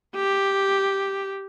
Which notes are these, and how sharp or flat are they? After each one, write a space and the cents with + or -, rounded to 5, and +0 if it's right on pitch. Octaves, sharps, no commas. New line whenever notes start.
G4 +0